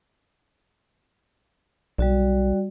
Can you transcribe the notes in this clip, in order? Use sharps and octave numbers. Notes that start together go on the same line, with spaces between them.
B1 G3 F#4 D5